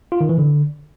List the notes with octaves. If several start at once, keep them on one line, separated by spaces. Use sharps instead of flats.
F4
D#3
E3
D3